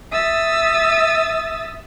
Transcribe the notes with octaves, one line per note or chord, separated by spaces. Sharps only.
E5 D#6 E6 A6